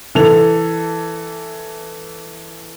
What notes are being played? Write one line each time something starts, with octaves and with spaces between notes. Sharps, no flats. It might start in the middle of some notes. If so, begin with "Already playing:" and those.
E3 A4 F7